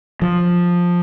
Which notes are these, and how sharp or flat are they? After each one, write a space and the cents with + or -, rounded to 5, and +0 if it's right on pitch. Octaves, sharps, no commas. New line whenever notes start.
F3 +10